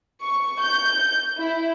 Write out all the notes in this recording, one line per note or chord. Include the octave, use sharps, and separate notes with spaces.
C#6
G6
E4